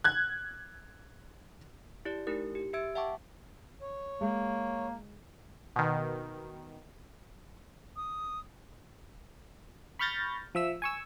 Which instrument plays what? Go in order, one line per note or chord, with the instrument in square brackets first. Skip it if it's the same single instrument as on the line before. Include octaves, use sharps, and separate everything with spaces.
[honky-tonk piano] F#6 G#6
[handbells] E4 G4 D5
A3 D#4 E4 G4 A#4
G4
G4 E5 E6 G#6 D7
E5 F#5 G5 A5 C#6 D6
[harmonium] C#5
[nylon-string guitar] G#3 [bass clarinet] A#3
[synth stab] B2 D#3
[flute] D#6
[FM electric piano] B5 C#6 F6 G6 A6 A#6
F3 E5 E6
G#5 C#6 E6